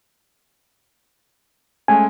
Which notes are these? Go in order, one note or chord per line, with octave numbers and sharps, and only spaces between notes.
G#3 A3 C#4 G#5